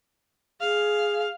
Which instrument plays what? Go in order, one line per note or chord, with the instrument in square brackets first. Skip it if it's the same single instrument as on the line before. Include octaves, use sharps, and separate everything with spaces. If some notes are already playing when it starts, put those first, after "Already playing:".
[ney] G#4 [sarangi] F5